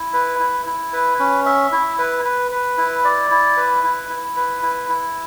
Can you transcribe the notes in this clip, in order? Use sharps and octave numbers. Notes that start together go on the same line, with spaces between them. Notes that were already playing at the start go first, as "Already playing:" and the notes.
Already playing: E4
B4
E4
E4
B4
C#4
E5
E4
B4
B4
B4
E4
D5
E4
B4
E4
E4
B4
E4
E4